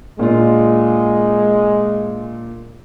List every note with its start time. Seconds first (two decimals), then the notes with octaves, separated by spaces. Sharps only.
0.19 A#2 G#3 D4 F4